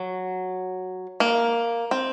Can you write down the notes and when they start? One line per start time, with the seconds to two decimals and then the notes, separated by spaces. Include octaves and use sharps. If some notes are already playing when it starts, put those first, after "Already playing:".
Already playing: F#3
1.20 A#3
1.91 C4